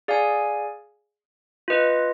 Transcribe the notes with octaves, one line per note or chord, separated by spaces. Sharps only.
G#4 D5 F5 G#5
F4 B4 D#5